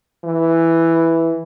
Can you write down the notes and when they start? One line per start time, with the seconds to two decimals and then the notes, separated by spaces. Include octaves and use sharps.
0.24 E3